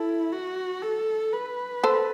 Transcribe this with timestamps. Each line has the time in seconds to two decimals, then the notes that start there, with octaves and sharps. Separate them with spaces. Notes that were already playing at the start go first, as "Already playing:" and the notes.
Already playing: E4 A4
0.32 F#4
0.82 A4
1.33 B4
1.84 A4 C5